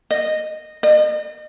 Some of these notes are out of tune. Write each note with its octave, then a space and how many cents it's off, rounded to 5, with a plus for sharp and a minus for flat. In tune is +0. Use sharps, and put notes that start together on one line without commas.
D#5 -10
D#5 -35